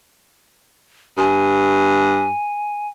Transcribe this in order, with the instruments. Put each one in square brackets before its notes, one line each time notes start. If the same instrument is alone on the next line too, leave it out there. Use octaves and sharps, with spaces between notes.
[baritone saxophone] G2 [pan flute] G#5